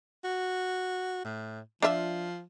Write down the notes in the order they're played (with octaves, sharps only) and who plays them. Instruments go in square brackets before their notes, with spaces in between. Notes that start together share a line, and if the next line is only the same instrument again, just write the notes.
[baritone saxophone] F#4
A2
[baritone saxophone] F3 [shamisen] D4 F4 E5